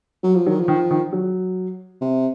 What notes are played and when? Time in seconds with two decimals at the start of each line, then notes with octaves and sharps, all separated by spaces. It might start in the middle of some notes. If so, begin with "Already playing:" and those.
0.23 F#3
0.36 F3
0.47 D#3 F#3
0.60 F3
0.68 D#3
0.91 D#3
1.13 F#3
2.01 C3